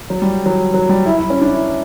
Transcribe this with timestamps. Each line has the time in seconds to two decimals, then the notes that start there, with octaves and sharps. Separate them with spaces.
0.10 F#3
0.22 G3
0.46 F#3
0.74 F#3
0.89 G3
1.06 E4
1.18 E4
1.30 C#4
1.42 D4
1.53 E4